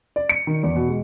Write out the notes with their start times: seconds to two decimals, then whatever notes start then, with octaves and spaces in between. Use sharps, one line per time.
0.16 D5
0.29 C#7
0.47 D#3
0.63 E2
0.76 B2
0.89 G#3